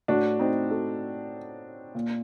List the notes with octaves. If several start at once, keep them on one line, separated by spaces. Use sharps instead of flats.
A2 D4 F#4
C4 D#4
F#4 A4
A#2